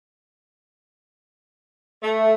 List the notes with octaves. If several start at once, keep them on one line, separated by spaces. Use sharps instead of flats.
A3